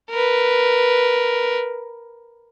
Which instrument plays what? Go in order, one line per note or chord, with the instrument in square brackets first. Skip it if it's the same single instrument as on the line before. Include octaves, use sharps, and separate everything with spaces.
[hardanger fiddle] A#4 B4